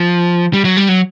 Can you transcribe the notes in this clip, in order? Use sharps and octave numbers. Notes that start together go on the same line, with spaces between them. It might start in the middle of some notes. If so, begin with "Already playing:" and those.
Already playing: F3
G3
F#3
G3
F#3